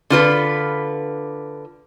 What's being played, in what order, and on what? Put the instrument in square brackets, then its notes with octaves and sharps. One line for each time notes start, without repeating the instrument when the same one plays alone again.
[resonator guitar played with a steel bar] D3 F4 B4